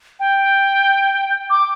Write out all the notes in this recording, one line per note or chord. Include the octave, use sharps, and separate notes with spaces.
G5
D6